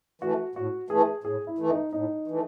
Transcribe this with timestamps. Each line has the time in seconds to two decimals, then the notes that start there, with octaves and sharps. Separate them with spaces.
0.22 E3 A3 F#4
0.55 A2 F#4
0.90 E3 A3 G#4
1.24 A2 G#4
1.47 E4
1.59 E3 A3
1.70 D#4
1.93 A2 D#4
2.28 E3 A3